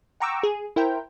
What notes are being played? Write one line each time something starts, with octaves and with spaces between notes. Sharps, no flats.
F#5 G5 A#5 C#6 D6 E6
G#4
E4 A#4 C5 G5